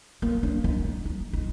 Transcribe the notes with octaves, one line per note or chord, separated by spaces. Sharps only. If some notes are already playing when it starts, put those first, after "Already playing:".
A#3
D4
D#4
D#4
D#4
D#4